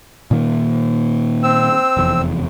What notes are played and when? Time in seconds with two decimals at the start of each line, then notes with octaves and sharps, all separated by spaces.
0.31 A#2 D#3 A#3
1.43 C4 E6
1.97 F1 E2